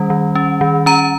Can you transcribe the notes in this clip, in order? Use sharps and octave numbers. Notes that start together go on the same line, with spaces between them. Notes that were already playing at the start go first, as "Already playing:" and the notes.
Already playing: D#3 G3 C#4
D#3
C#4
D#3
C#4 A#5